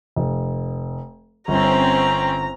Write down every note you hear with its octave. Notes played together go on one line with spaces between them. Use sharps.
F1
G1 C4 C#4 A#5